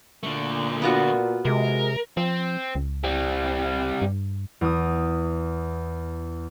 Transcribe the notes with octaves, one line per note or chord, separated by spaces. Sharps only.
A#2 D3 A3
B3 F4 F#4
C3 G#3 A#4
F3 C4
C#2
G3 C4
G2
E2 D#6